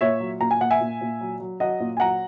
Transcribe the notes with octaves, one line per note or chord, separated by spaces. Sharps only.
A#2 C#5 E5
F#3
A#2 A#5
G#5
A#2 F#5
E5 G#5
A#2
A#2
F#3
F#3
F#3 D#5 F#5
A#2
G#5
F#3 F#5 A#5